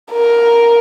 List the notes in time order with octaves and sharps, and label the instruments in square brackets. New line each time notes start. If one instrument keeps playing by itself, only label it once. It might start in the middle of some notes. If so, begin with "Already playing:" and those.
[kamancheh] A#4